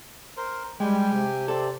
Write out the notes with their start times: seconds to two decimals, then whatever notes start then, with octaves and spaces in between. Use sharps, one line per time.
0.37 A#4 C5
0.80 G3 G#3 G4 G5 G#5
1.13 C3
1.48 C4 A4 D5